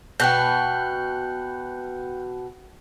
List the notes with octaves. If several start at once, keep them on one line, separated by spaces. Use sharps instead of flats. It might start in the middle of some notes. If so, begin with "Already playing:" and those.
B2 G5 F#6 G6